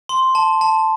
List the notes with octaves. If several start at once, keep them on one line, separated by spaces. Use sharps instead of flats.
C6
A5
A5